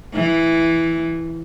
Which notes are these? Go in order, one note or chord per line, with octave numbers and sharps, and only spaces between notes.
E3